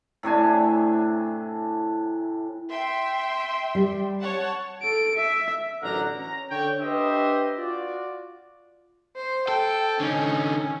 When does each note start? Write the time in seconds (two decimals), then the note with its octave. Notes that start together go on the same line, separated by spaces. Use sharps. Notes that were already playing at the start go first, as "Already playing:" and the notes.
0.23 A2 C3 D4 G#5
2.70 E5 G5 C6
3.75 G3
4.21 C#5 F#5 A5
4.83 A4 D7
5.15 E5
5.82 A1 D3 F#3 A#4 F#5 A#5
6.19 C#4 A#5
6.50 D3 C#5 G5
6.80 D4 G4 B4 C5 D#5 E5
7.58 F4 F#4 D5
9.16 C5
9.48 A4 G5
10.00 D3 C#4 D#4